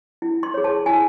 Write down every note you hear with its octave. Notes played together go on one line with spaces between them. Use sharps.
E4
C6
G#4 C#5
A5
E4 G#5